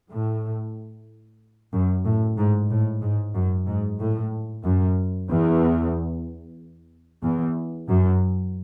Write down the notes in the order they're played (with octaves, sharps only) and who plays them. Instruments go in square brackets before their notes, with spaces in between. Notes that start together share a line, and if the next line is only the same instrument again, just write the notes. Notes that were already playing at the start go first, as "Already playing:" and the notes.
[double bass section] A2
F#2
A2
G#2
A2
G#2
F#2
G#2
A2
F#2
E2
E2
F#2